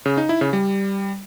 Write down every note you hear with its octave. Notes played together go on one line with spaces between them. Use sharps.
C#3
D#4
E4
C#3
G3